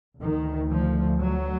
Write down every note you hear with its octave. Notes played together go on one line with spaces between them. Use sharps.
D2 D#3
F3
F#3